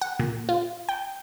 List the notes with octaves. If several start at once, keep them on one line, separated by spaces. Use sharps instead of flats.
F#5
A#2
F4
G5